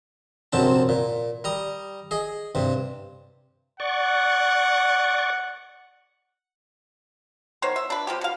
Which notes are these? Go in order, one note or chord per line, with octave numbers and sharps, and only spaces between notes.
A#1 F#2 C3 C4 A5
A#2
G3 A#5 D#6
G#4 D#5
G2 C3
D5 F#5 C#6
D#3 B3 C5 C#5
E5
D4 B4
F3 C4 G4
B2 F5